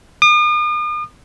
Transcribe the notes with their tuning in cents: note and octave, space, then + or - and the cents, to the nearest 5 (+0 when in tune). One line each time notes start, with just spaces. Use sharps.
D#6 -45